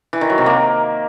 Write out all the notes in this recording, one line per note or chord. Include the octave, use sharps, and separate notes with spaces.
E3
D#3
F#3
C3
A#3